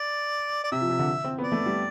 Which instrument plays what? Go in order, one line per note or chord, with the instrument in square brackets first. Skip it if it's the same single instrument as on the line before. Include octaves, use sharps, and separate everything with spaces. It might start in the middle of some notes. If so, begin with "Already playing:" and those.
Already playing: [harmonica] D5
D5
[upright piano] C3 [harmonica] E5
[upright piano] F3
C3
D3
C4
B3
[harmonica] D5
[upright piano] A3
G3